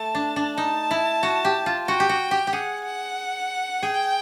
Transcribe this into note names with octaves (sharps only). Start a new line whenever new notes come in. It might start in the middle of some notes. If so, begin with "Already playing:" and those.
Already playing: A3 A5
D4
D4
D#4 A5
E4
F#4
G4
F4
F#4 G5
G4
F#4
G4
G4
G#4 F#5
F#5
G#4 G5